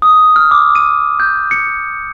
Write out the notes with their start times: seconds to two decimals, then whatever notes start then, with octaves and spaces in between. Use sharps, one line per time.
0.02 D#6
0.36 F6
0.51 D6
0.75 D#7
1.20 G6
1.51 C#7